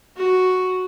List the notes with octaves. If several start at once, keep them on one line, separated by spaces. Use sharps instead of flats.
F#4